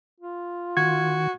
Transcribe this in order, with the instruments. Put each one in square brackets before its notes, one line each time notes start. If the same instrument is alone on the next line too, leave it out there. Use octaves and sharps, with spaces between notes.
[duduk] F4
[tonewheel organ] D#3 [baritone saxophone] F#4 [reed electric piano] G#6